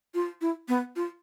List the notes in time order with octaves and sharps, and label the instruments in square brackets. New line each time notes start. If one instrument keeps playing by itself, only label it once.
[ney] F4
E4
B3
F4